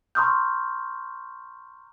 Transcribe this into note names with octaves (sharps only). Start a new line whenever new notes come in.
A#5 C6 C#6 D#6 F6 G6